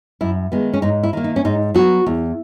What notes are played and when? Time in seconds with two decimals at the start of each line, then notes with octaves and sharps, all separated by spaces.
0.21 F#2 E4
0.52 D#3 G#3 B3
0.74 C#4
0.82 G#2 D#4
1.03 E4
1.13 D#3 A#3
1.24 D#4
1.36 C#4
1.45 G#2 D#4
1.74 F#3 B3 F#4
2.06 E2